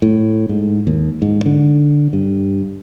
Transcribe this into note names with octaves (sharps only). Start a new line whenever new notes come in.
A2
G#2
D#2
G#2
D3
G2